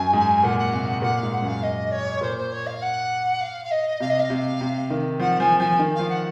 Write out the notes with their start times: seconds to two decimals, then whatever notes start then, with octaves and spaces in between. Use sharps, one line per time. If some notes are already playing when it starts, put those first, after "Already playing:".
Already playing: F#2 G#5
0.13 G#2
0.44 A#2 F#5
0.58 F#5
0.72 C3 F5
0.87 F#5
1.02 A#2 F#5
1.17 F5
1.23 G#2
1.33 F#5
1.42 F#2
1.47 F5
1.63 D#5
1.91 C#5
2.21 A#2 C5
2.37 C5
2.52 C#5
2.66 F5
2.82 F#5
3.41 F5
3.64 F5
3.71 D#5
4.00 C3 F5
4.10 D#5
4.19 F5
4.30 C3
4.61 C3
4.90 D#3
5.20 F3 F#5
5.40 F3 G#5
5.60 F3 G#5
5.79 D#3
5.95 F3 F5
6.09 F#5